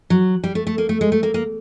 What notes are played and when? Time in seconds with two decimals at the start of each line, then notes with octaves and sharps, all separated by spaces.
0.10 F#3
0.44 G3
0.55 A3
0.67 A3
0.78 A#3
0.89 A3
1.01 G#3
1.12 A3
1.23 A#3
1.34 A#3